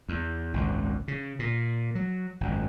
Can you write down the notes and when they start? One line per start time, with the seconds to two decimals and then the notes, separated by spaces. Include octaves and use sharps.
0.09 E2
0.54 G#1 C#2 F#2
1.08 C#3
1.39 A#2
1.95 F#3
2.41 G#1 F#2